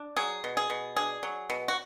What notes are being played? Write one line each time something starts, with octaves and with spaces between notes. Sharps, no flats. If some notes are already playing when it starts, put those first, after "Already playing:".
Already playing: D4
F#3 G#4
B2
G#4
B2
D4 G#4
F#3
B2
F#4